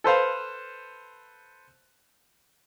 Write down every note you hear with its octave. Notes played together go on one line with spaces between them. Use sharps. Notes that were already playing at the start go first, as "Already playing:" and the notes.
A4 B4 C5 F5